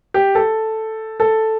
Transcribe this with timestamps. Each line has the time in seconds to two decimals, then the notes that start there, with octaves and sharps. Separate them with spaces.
0.14 G4
0.35 A4
1.20 A4